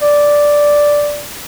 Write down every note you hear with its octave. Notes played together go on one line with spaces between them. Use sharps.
D5